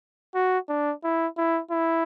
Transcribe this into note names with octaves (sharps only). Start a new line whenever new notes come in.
F#4
D4
E4
E4
E4